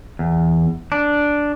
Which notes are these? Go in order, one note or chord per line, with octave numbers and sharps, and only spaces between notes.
E2
D4